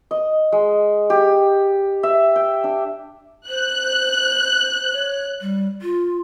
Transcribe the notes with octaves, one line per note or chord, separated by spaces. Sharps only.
D#5
G#3
G4
E5
G5
D4
C5 F#6
C#5
G3
F4